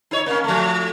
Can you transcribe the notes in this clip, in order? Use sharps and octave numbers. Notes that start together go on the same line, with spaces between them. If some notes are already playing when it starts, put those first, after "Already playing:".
D#4 C#5
A#3 C#4
F3 A3